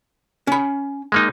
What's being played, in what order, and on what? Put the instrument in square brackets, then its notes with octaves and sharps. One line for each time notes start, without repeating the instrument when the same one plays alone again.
[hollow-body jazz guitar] C#4 B5
[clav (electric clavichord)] G#3 A#3 D#4